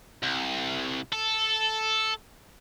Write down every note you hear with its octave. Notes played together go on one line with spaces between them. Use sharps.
C2
A4